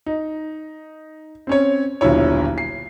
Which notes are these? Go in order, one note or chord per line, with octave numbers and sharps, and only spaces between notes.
D#4
C4 C#4 C#5
D#1 B1 D3 E4 C#5
C7